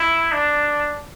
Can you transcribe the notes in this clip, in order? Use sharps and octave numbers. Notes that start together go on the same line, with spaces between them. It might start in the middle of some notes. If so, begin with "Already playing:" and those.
Already playing: E4
D4